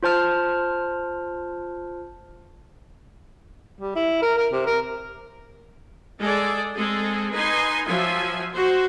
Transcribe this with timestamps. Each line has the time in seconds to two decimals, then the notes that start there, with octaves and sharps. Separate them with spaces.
0.03 F4 C5 A5 F6
3.81 G3
3.96 E4
4.22 A#4
4.38 A#4
4.52 C3
4.67 A#4
6.19 G#3 G#4 A4 D5
6.75 G#3 C4 G#4 A4
7.32 D#4 B4 G#5 C6
7.86 F3 F#3 F4 E5 G#5
8.52 F#4 C5